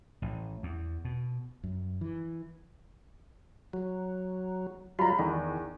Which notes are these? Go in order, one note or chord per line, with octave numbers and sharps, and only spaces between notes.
A1
E2
B2
F#2
E3
F#3
F#3 G3 F4 A#5 B5
E2 D#3